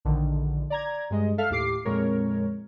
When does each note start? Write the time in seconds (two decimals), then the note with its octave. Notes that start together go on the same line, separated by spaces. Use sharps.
0.05 A#1 D3 D#3
0.70 D5 A#5 G#6
1.10 G2 G#3 D#5
1.38 A4 E5 F5 F6
1.50 D#2 A2 G4 D6 C7
1.85 F2 A#2 G#3 A#4 C#5